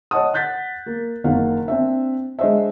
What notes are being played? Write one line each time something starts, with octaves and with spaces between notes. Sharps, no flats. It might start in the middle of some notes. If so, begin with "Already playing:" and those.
C#5 D#5 F#5 A5 D#6
F#5 F#6 G6 A6 B6
A#3
F#1 D#3 A#3 F5 F#5
C4 D4 E5
G#3 D4 C5 D#5 E5